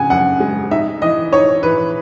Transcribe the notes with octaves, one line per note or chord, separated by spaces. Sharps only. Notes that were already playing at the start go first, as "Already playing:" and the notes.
Already playing: C#3 F#5 G#5
F#2 F#5
G#3
D#4 E5
E3 D#5
D#4 C#5
E3 B4